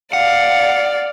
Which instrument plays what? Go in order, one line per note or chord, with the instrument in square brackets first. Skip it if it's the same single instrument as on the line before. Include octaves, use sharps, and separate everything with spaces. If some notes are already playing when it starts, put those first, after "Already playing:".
[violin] D5 [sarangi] F5 [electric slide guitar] F#5